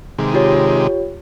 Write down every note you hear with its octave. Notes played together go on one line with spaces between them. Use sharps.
C3 D#3 G#3
F4 G4 C#5